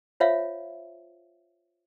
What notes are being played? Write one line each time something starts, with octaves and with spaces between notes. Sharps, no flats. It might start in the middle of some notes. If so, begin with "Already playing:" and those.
F4 C5 C#5 E5 F5